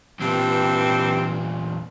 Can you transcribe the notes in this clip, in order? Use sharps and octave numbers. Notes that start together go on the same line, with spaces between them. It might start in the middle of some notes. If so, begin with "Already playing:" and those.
E2 G2 A#2 E3 C4